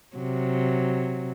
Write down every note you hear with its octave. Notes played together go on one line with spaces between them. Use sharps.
C3 F#3